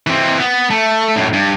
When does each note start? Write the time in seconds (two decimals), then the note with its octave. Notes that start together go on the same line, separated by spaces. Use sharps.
0.07 E3 C4
0.39 B3
0.70 A3
1.16 F#2 A2
1.33 G2